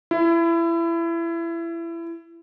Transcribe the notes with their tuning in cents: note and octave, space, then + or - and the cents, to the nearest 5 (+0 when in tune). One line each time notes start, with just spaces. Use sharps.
E4 +25